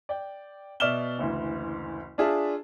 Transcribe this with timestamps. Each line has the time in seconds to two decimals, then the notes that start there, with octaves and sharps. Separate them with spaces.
0.09 D5 G5
0.80 B2 D5 E5 F6 E7 G7
1.18 F#1 D2 E3
2.18 D4 F4 G#4 E5 A5